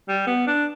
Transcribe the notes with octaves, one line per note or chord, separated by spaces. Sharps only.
G3
B3
D4